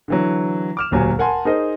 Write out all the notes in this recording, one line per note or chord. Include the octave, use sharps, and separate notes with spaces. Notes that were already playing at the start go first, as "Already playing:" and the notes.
D3 E3 F#3
D6 F6 E7
E1 D2 A#2 F#3 G4 G#5
A#4 F#5 G#5 A5 C6
D#4 G#4 A#4 C5 D#5